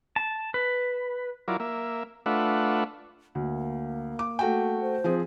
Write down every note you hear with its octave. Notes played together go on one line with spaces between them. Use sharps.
A5
B4
F#3 E4 F4 A#4 D5
A#3 E5
A3 D4 F4 B4 E5 F#5
D2 A#3
D6
A3 F#4 G5
C5
F3 C4 G#4